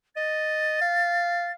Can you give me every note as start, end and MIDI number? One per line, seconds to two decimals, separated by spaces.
0.16 0.81 75
0.16 1.52 93
0.81 1.55 77